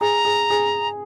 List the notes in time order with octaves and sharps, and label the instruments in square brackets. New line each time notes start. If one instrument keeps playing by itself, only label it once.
[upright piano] G#4 [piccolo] A#5
[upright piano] G#4
G#4